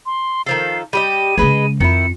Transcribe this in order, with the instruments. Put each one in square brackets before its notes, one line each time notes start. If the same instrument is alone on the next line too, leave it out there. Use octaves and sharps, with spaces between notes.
[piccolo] C6
[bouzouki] D#3 F3 A4 [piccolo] C7
[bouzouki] G3 G4 D#5 [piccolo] D#7
[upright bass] C#3 G#3 [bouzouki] G#4 B4 D#5
[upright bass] F2 [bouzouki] D#3 E4 [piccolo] C#7